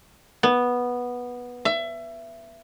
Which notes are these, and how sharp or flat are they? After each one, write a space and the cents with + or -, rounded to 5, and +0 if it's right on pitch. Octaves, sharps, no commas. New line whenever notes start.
B3 -10
E5 +25